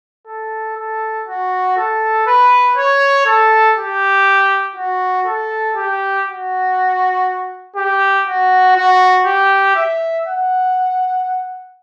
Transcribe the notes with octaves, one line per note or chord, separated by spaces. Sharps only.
A4
A4
F#4
A4
B4
C#5
A4
G4
F#4
A4
G4
F#4
G4
F#4
F#4
G4
E5
F#5